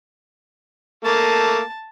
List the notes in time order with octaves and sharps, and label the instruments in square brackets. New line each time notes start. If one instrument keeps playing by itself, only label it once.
[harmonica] A3 A#3 [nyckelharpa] A5